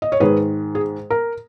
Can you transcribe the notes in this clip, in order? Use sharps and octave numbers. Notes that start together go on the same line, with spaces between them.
D#5
C#5
G#2 D#3 G#3 G#4 B4
G#4
A#4